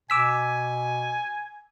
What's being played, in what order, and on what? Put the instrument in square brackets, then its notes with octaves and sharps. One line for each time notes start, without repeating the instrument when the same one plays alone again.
[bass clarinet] B2 [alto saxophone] G#5 [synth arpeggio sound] D6 E6 B6